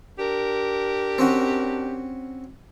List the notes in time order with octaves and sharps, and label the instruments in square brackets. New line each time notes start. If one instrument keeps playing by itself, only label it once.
[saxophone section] D4 G4 A#4
[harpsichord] C4 C#4 F#4